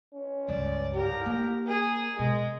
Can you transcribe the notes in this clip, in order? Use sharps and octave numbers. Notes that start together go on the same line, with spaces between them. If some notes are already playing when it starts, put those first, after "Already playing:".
C#4
C#2 G2 D5
G4 A#4
A#3
G#4 A#4
B2 G#3